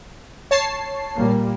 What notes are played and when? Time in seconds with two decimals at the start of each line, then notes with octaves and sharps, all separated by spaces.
0.51 C#5 A5 C7
1.15 A#2 G3 A#3